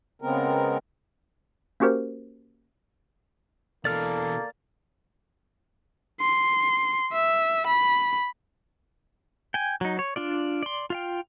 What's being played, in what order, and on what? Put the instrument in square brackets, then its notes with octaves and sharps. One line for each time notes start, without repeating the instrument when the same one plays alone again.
[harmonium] C#3 G#3 B3 C4 A#4
[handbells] A#3 C#4 F#4 G4 A#4 C5
[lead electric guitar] B2 E3 [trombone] A#3 [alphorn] A4 [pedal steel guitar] D5 F6
[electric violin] C6
E5
B5
[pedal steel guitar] G5 G#5
F#3 D#4
C#5
D4 F4 D5
D5 C6
F4 F5 G5